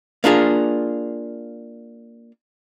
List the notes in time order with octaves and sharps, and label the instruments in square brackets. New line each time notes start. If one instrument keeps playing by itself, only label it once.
[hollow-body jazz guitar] A#3 D4 F4 G#4